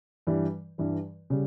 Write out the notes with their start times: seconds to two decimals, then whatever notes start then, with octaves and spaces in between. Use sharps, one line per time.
0.27 G2 E3 G3
0.78 G2 E3 G3
1.30 C#3 G3